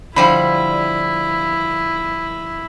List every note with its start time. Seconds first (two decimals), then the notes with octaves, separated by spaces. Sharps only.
0.16 D3 F3 G3 E4 B5